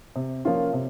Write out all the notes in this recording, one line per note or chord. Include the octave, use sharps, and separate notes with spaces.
C3
F3 A#3 C#4 F4
C3